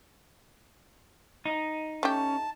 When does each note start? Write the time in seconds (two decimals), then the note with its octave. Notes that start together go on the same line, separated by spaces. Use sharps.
1.46 D#4
2.03 A3 C#4 G4 A5